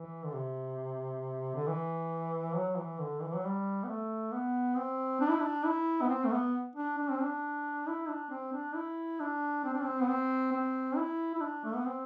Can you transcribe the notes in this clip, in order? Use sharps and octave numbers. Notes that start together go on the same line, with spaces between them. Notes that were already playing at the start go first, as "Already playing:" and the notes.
Already playing: E3
D3
C3
D3
E3
F#3
E3
D3
E3
F#3
G3
B3
A3
B3
C4
D4
E4
D4
E4
B3
C4
A3
B3
D4
D4
C4
D4
E4
D4
C4
D4
E4
D4
C4
D4
C4
B3
C4
C4
E4
E4
D4
A3
B3
C4